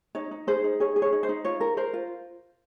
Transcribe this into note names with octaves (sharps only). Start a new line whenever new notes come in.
D#4 C#5
D#4
G#4 C5
D#4
G#4 C#5
G#4
C#5
D#4
C5
D#4
F4 C#5
A#4
A#4 C5
F4